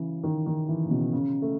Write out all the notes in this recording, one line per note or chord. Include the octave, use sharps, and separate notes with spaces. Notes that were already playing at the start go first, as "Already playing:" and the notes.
Already playing: C#3 E3
D#3
D#3
E3
C#3
B2
C#3
A3